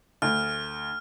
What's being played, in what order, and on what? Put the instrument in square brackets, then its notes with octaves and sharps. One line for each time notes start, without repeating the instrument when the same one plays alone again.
[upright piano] D2 [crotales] F6